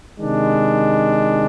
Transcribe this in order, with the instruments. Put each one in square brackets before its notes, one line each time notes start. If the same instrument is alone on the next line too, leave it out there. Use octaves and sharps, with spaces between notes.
[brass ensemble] C3 D#3 G#3 D4